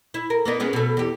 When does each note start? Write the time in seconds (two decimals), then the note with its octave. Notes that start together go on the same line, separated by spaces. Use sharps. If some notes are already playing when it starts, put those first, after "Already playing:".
0.14 E4
0.30 A#4
0.45 A#3 B3 D#4
0.60 G#3 B3 C#4
0.73 B2 A3
0.97 E2 G4